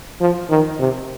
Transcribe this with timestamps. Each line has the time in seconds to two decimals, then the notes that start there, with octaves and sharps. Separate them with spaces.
0.20 F3
0.49 D#3
0.79 C3